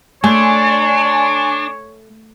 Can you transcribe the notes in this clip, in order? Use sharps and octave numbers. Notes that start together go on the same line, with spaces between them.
A3 D4 C#5 G#5 C6